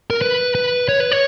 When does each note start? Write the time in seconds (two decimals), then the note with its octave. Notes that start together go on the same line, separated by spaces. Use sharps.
0.10 A#4
0.22 B4
0.55 B4
0.89 C#5
1.00 B4
1.12 C#5